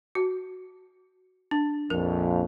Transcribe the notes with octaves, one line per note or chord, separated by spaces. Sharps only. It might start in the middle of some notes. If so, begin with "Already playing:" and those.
F#4
D4
A#1 F2 A#4